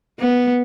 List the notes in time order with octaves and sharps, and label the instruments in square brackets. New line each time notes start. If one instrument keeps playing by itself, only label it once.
[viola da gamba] B3